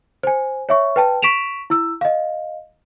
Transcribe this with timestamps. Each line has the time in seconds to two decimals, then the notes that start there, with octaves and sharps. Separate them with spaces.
0.23 C5 G#5
0.69 C#5 E5 C#6
0.96 B4 G5 A5
1.22 C#6 B6 D7 E7 F7
1.70 E4 E6
2.01 D#5 F5